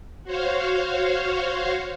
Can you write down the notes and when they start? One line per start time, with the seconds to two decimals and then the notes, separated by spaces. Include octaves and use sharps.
0.24 F#4 C5 C#5 F5